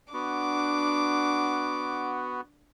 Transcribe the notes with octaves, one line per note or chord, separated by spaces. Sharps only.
B3 D4 F#4 D6